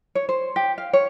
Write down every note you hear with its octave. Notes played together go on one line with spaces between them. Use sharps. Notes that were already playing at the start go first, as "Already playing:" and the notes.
C#5
C5
G4
F5
C#5